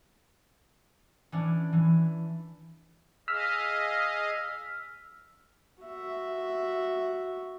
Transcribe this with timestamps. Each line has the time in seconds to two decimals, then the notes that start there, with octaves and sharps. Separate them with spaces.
1.32 E3 C#4 D4
1.73 E3
3.28 G#4 D#5 F5 E6 F6 B6
5.83 F#4 E5